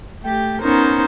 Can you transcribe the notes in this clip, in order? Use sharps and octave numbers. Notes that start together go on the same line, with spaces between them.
A3 G4
B3 C#4 D#4 A#4 C5